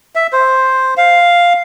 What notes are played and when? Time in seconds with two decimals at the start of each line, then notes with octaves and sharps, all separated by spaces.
0.15 E5
0.33 C5
0.97 F5